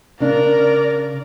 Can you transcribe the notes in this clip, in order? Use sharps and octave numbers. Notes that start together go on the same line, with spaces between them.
C#3 D4 A#4 D5